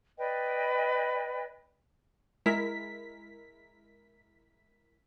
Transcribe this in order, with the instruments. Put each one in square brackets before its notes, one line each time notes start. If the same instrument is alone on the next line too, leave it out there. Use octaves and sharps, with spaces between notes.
[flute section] B4 D5 D#5 G5
[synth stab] G#3 E4 A#4 B6